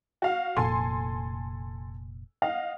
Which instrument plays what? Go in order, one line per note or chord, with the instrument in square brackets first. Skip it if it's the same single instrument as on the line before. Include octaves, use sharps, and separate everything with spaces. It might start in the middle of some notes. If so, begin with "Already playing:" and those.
[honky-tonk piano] F#4 F5
[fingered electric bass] F1 A#2 [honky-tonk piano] A4 G#5 C6
[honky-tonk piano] D#5 F5 F#5